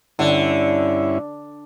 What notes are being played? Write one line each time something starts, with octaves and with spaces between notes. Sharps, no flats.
G2 D3 C#4 E4